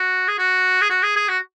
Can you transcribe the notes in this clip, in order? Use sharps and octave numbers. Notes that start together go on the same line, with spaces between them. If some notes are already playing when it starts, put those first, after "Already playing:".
Already playing: F#4
G#4
F#4
G#4
F#4
G#4
G#4
F#4